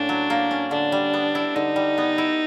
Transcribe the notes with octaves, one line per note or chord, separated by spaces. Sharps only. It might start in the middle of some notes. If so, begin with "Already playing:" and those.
Already playing: A2 A#3 C#4 D4
F#3
A#3
C#4
D3 D4
G3
B3
E4
D3 D#4
G3
B3
E4